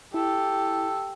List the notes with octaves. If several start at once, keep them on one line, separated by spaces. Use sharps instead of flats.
E4 G4 A4